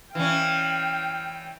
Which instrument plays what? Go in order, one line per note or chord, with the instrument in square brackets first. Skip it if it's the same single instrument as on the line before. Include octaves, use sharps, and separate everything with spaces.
[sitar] E3 C#4 [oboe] F5 [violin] G5